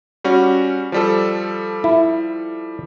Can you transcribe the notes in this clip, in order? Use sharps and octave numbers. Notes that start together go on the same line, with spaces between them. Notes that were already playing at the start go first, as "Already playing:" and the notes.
G3 C#4 F#4
F3 G3 A4
E4